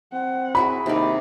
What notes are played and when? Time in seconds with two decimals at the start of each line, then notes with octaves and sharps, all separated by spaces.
0.13 C4 F#5
0.55 E4 F#4 G#4 B5
0.86 D#2 C3 D#4 D5